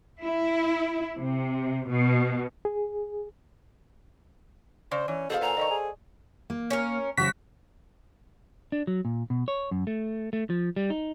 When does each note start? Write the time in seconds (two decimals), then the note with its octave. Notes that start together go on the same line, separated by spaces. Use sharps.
0.22 E4
1.16 C3
1.89 B2
2.65 G#4
4.91 C#3 C5 D5
5.08 E3 C#4
5.30 B2 G#4 A4 B4 C5 F5
5.41 A#2 F#5 G#5 A#5
5.57 D#3 D5 D#5 C#6
5.71 G#4
6.50 A#3
6.70 C#4 A#4
7.17 C#3 F#3 F#4 C5 B6
8.72 D4
8.87 F#3
9.05 A#2
9.30 B2
9.48 C#5
9.71 F#2
9.87 A3
10.33 A3
10.50 F3
10.76 G3
10.90 D#4